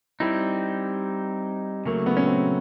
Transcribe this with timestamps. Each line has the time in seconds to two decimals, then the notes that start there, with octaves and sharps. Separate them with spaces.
0.20 G3 C4 D#4 E4
1.85 C#3 F#3 A3 A#3
2.06 B3
2.17 C#4
2.27 C4